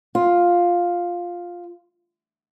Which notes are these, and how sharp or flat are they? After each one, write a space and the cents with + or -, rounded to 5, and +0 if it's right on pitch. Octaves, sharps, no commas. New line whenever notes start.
F4 +5